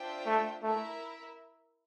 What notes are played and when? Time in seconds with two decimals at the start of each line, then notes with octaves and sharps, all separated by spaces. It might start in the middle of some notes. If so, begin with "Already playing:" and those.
Already playing: D4 F4 C5 E5 G5
0.26 A3
0.63 A3 E4 A#4 E5